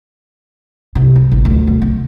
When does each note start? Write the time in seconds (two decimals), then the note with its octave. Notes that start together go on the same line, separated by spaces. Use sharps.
0.95 C3
1.16 C#2
1.32 A1
1.45 D2
1.67 B1
1.82 C#3